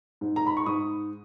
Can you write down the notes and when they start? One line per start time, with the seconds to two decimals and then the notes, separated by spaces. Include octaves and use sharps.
0.21 G#2
0.36 A#5
0.47 B5
0.57 C#6
0.66 G#2 D#6